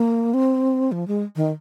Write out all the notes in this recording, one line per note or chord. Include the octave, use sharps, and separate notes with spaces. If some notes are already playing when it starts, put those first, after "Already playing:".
Already playing: A#3
C4
F3
G#3
D#3